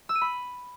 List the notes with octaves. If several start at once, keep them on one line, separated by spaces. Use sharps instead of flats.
E6
D#7
B5